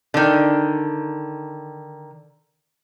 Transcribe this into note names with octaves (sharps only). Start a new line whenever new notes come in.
D3 D#3